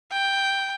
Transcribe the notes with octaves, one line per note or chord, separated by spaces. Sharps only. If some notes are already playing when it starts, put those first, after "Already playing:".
G5